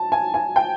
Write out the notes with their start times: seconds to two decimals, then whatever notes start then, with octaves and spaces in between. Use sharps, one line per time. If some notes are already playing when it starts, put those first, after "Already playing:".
Already playing: A5
0.12 G#5
0.34 G#5
0.56 G5